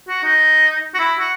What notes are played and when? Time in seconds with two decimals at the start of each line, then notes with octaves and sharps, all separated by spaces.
0.09 F#4
0.24 D#4
0.94 F#4
0.99 E4
1.19 F#4